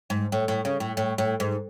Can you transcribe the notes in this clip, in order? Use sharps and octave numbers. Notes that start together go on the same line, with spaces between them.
G#2
A2
A2
C#3
A2
A2
A2
G#2